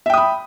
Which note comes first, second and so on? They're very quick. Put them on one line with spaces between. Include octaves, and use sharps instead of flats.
E5 G5 D#6 B5